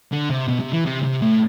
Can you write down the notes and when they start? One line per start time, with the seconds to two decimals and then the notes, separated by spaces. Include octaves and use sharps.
0.12 D3
0.30 C3
0.48 B2
0.60 C3
0.73 E3
0.85 C3
1.02 C3
1.22 A2